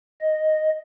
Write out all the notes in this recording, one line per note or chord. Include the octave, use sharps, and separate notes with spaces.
D#5